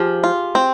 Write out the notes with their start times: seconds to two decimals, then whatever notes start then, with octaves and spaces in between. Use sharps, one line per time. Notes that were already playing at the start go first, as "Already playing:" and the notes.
Already playing: F3 G4 G#4
0.24 F4
0.55 C4